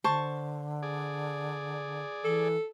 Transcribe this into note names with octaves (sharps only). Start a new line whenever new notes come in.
D3 C5 A5 C#6
G#4 D5
E3 A4